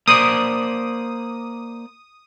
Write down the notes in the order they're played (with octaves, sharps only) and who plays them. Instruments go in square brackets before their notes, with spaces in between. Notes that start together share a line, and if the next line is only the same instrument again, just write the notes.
[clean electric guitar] A#3 C5 D5 [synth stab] D#6